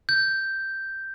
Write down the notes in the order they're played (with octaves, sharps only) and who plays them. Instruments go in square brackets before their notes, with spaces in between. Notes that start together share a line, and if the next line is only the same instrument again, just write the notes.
[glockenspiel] G6